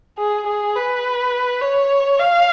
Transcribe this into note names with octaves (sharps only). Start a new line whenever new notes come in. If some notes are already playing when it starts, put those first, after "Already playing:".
G#4
G#4
B4
C#5
F5